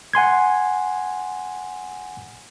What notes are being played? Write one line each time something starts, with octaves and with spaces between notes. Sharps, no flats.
F#5 G#5 C6 G#6